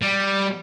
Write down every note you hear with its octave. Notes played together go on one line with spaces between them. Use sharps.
G3